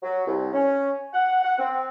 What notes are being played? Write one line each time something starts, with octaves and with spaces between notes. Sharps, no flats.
F#3
C2
C#4
F#5
F#5
C4